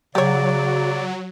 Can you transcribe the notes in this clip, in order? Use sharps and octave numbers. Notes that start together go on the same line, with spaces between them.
C#3 F#3 G4 C#5 D5